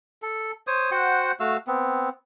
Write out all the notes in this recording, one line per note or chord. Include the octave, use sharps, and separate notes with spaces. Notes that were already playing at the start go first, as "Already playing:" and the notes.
A4
C5 C#5 D#6
F#4 C5 F#5 G5
A3 F#4 F5 E6
B3 C4